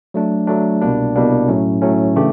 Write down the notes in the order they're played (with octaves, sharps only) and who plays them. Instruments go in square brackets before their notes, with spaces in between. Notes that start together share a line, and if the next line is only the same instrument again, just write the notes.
[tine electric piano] F#3 A3 D4
F#3 A3 D4
C2 B2 G3 A#3 D4
C2 B2 G3 A#3 D4
A2 F#3 A3 C#4
A2 F#3 A3 C#4
C#3 E3 A3 D4 G4